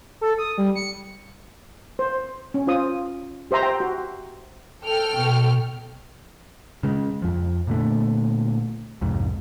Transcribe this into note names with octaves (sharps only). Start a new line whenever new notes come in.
A4
D#6
G3
C#7
C5
C#4
F4 C5 D#6
G4 C5 E5 A#5 C6
G5
F#4
A4 G5 F6
B2
C#3 G#3
F2 F3
A#2 D3 A3
C2 F2 G#2